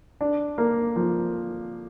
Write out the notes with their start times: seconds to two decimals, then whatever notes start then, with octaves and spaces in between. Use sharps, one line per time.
0.21 D4
0.58 A#3
0.96 F3